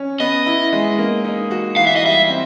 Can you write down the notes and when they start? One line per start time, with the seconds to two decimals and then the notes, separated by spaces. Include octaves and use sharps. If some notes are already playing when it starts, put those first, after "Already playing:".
Already playing: C#4
0.20 B3 D#5
0.46 E4
0.73 G#3
0.98 A#3
1.24 D#4
1.51 F#4
1.76 E3 F5
1.87 E5
1.96 D#5
2.03 G3 E5
2.29 C4